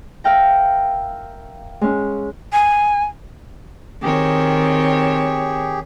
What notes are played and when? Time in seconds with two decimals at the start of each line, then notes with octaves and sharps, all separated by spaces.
0.24 A#4 E5 F5 G5 A#5
1.81 G#3 C#4
2.52 G#5
4.02 D#3 C4 G4 G#4 C#5